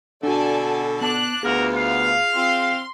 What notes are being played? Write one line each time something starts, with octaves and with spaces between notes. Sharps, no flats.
B2 D3 D4 F#4 A4 D5 G#5 A5
B3 D4 A5 F#6
D2 A#3 B3 F4 F#4 G#4 A#4 F6
F5
C4 F4 C6